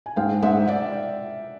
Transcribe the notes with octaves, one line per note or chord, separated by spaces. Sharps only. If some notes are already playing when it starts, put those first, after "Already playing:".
G#5
G#2 F5 G5
G#2 E5 F#5
D5 E5